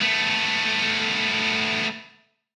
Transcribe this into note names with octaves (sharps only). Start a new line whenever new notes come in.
A3 B3